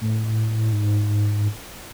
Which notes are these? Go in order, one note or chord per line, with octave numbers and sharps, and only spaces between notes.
A2
G#2